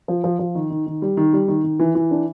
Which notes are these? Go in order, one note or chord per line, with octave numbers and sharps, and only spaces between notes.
F3
F3
F3
D#3
D#3
D#3
G3
D#3
G3
D#3
D#3
E3
E3
D4